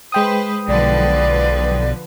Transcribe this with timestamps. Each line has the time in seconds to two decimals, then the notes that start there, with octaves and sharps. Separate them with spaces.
0.12 G#3 B4 C5 G5 D#6
0.68 B1 D3 F3 B4 D5